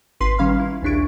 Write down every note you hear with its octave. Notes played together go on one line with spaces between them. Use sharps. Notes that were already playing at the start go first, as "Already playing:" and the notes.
G#1 B4 C6 B6 C7
D#3 G3 C#4 F5 B5 F6
E4
A#1 D#2 D4 E4 C#6 D7